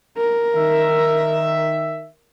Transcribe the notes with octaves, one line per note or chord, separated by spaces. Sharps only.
A#4
D#3 E5